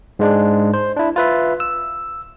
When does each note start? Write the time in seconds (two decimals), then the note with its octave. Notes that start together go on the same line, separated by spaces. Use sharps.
0.19 G#2 G#3 D4
0.74 C5
0.97 D4 E4
1.16 F4 B4 E5
1.60 E6